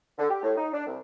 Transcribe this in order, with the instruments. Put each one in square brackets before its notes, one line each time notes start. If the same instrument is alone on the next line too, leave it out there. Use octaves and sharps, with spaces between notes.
[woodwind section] D3
G4
A2
D#4
D4
C2